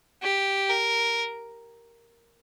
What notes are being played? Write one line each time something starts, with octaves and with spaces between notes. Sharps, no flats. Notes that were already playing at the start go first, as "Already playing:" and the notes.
G4
A#4